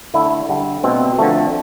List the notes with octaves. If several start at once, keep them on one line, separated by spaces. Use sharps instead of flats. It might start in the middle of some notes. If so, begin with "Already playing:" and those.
D3 A3 E4
D3 G3
B2 A3 C4
D3 F3 A3